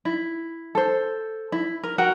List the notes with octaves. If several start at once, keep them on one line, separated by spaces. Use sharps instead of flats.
E4
A4 C5
E4
A#4
F#4 A#4 F#5 G5